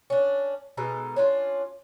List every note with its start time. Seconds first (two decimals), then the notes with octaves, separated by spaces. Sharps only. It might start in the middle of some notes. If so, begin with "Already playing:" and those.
0.10 C#4 D4
0.77 B2 G#3 D#4 A4
1.16 C#4 D4 F4